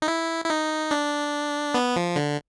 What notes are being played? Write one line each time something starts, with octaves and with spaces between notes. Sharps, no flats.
D#4
E4
E4
D#4
D4
B3
F3
D3